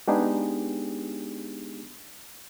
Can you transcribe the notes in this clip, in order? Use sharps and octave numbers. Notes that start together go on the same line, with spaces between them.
G#3 B3 D4 D#4 G4 G#4